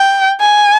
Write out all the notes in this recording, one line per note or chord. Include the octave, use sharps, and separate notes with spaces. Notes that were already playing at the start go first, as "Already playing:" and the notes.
Already playing: G5
G#5